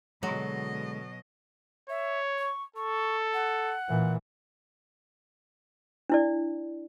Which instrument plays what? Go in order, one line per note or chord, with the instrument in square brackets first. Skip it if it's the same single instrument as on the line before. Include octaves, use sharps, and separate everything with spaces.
[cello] B2 D#5 [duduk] D3 [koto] F#3 [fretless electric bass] G#3
[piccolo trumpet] C#5 [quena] E5
[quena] C#6
[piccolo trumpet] A4 [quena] C#6
[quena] F#5
[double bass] A#2 E3
[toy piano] D4 E4 D5